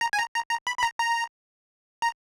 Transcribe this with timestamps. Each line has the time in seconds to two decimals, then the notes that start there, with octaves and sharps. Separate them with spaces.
0.01 A#5
0.13 G#5
0.19 A#5
0.35 A#5
0.50 A#5
0.67 B5
0.79 B5
0.83 A#5
0.99 A#5
2.02 A#5